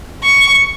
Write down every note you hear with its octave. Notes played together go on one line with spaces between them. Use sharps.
C#6